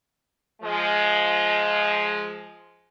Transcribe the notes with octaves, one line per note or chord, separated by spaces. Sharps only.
F3 G#3